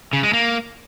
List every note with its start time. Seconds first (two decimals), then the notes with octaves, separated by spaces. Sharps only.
0.13 C#3
0.23 G#3
0.33 A#3